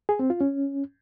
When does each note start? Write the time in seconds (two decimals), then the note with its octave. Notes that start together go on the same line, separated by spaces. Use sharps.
0.09 G#4
0.19 C4
0.30 F4
0.41 C#4